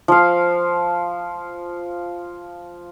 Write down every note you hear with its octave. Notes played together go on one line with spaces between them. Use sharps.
F3 F5